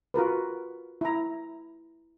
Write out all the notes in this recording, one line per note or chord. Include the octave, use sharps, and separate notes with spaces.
F4 F#4 A#4 B4
E4 A#5